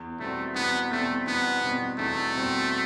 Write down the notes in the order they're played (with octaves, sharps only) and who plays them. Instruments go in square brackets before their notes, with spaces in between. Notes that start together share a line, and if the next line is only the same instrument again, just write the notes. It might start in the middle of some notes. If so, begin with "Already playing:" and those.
Already playing: [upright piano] E2
[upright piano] B2 G3 C4 [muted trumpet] A3
[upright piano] E2 [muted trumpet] B3
[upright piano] B2 G3 C4 [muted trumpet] A3
[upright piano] E2 [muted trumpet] B3
[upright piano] B2 G3 C4
[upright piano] E2 [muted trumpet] A3
[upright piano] B2 G3 C4